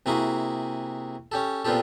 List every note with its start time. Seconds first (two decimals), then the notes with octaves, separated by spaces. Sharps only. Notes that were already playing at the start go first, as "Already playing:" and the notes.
0.06 C3 A#3 E4 F#4 G#4
1.32 C#4 G4 A4
1.65 A#2 B3 C4 F4 G4 A4